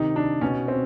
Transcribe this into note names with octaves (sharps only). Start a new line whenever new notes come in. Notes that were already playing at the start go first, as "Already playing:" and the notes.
Already playing: C3 D#3 D#4
D4
B2 C#4
C4